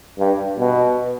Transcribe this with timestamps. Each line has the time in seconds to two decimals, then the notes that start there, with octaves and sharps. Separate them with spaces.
0.19 G2
0.59 B2